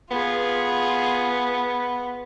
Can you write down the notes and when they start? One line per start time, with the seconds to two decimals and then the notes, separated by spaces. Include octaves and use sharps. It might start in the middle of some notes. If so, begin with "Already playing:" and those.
0.11 B3 F4 G#4